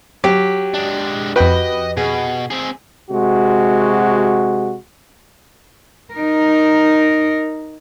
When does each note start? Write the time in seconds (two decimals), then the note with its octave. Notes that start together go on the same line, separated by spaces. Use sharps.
0.24 F#3 G4
0.74 G#3 D4
1.36 F2 F#4 B4 D#5 G5 B5
1.97 B2 G#4
2.51 C4 G#4
3.10 C3 G#3 F#4
6.15 D#4 A#4